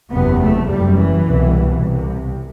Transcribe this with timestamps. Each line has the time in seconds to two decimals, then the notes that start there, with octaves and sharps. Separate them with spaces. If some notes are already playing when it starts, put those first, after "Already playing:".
0.11 F#1 E2 C3 B3
0.40 A3
0.69 F#1 F#2 G3
0.97 E3
1.25 C2 B2
1.83 C2 C3